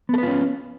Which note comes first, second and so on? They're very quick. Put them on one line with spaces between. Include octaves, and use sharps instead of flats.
B3 A4 B4 F4 C#4